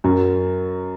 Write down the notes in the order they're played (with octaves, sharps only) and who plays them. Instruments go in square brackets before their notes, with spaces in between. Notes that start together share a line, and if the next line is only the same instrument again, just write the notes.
[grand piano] F#2